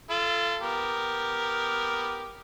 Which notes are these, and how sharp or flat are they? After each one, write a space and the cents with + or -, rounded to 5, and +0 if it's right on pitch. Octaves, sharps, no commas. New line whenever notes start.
F4 -30 A4 +0
B3 +0 G4 +0 A#4 +0